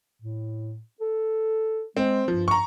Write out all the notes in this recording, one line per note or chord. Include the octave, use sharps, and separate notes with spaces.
A2
A4
G#3 C4
G2 F3
A#5 C#6